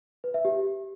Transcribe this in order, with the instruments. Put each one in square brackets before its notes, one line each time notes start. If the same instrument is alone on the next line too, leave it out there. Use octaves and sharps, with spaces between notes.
[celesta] B4
E5
G4